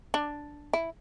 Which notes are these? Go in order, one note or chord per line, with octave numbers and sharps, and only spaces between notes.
D4
E4